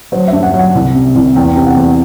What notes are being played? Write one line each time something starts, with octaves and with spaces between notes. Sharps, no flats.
F#3 C5
G2 E5
F#5
F#3
F#5
C2
C3
C2
E2 G5
C3 G5
F#5
E2